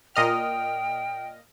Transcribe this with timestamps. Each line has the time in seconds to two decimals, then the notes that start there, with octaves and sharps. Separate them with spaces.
0.16 A#2 D#5 G5 F6